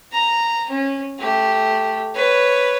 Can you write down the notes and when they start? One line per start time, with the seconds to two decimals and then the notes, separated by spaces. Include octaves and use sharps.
0.12 A#5
0.70 C#4
1.19 A3 G4
2.15 B4 C#5